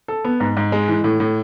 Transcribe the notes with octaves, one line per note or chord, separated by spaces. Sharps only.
A4
B3
G#2
G#2
G#3
E3
A2
A2